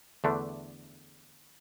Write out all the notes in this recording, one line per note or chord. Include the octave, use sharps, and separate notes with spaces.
E2 D3 A3 D4